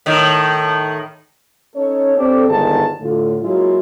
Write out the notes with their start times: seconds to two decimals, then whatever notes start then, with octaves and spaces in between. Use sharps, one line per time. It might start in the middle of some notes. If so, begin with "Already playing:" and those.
0.06 A2 D#3
1.74 C#4 D#4 A4 C#5
2.16 C4 D4 G4 A4
2.48 G1 G#2 D#3 G#4 A5
3.00 A2 D3 F4
3.41 F#3 G#3 A#3 E4 F4